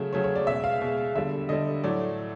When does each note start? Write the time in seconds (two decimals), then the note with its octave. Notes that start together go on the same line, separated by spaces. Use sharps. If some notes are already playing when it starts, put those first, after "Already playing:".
Already playing: C#3 F#3 A3
0.13 C#3 F#3 A3 C#5
0.24 C#5
0.36 D5
0.47 B2 G#3 E5
0.64 F5
0.82 B2 G#3
1.15 D3 G3 E5
1.49 D3 G3 D#5
1.84 A2 F#3 A3 D5